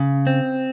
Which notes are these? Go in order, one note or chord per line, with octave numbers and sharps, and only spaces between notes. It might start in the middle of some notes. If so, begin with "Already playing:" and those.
Already playing: C#3
C4